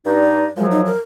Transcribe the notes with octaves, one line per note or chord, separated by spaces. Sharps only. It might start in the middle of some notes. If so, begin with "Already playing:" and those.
G2 D#4 D5
F#2 F3 F#3 G#3
D#4
A#4